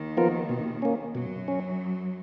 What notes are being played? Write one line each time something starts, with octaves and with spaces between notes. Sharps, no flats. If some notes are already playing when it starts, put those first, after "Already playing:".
Already playing: D#2 D#3
F3 B3 F4 A#4
B2
A#3 C#4
F#2 B2 F#3
C#4